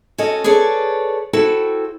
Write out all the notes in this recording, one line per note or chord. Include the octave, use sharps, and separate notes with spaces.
C#4 F#4 A4 D#5
G#4 A4 B4 C#5 D5
E4 F#4 A4 C5 G5